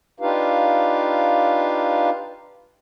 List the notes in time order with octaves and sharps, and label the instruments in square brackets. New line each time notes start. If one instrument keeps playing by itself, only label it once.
[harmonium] D4 D#4 F4 G4 B4 F5